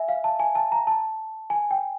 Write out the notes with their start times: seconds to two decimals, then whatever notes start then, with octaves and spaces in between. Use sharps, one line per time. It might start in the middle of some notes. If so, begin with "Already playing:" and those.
Already playing: E5 G#5
0.09 F5
0.24 A5
0.40 G#5
0.55 A5
0.72 A#5
0.87 A5
1.50 G#5
1.71 G5